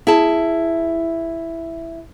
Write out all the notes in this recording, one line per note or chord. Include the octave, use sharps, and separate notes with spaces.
E4 G#4 A5